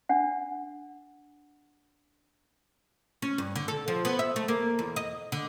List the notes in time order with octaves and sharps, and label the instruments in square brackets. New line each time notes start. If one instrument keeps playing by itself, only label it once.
[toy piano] D4 F#5
[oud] C#4
G2
D3
A4
F3
B3
E5
A3
A#3
E2
D#5
D3